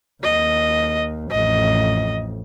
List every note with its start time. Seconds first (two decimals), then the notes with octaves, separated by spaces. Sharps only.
0.24 D#2 D#5
1.32 A1 F2 D#5